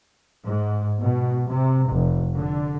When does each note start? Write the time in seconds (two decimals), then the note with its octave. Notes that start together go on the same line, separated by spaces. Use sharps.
0.45 G#2
1.02 B2
1.50 C3
1.91 F1
2.37 D3